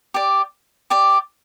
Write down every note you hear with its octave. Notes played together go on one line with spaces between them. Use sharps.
G4 D5
G4 D5